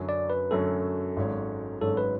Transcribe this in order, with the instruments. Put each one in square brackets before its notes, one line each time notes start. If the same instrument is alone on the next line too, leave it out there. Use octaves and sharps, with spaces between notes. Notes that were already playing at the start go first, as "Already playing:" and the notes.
Already playing: [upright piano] F#2 D3 F#3 C#4
[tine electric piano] D5
B4
[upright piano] F#2 D3 F#3 C#4 [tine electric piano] A4
[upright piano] G#1 G#2 F#3 C#4
[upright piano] G#1 G#2 F#3 C#4 [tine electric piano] A4
[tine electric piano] B4